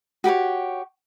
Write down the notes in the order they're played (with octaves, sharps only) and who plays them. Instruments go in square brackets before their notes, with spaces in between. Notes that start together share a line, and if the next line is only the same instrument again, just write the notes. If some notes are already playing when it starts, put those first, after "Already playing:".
[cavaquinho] F#4 G4 B4 C#5